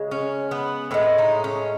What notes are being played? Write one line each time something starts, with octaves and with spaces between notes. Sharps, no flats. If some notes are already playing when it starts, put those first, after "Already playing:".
Already playing: C#3 G#3
C#4
B3
A2 G#3 B3
D#4
C#4